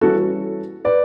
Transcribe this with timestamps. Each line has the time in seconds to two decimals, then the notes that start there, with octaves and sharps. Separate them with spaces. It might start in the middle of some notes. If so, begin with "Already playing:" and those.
0.01 E3 G3 C#4 E4 F#4 A4
0.85 B4 D5